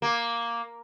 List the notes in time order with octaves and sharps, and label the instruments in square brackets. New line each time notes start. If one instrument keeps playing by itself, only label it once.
[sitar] A#3